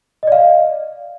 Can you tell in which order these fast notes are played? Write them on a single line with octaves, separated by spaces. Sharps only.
D#5 D5 F5